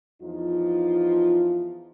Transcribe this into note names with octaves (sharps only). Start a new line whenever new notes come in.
E2 F3 D#4 F4